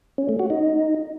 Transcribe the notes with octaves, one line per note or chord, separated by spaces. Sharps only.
C#4
A3
F#4
D#4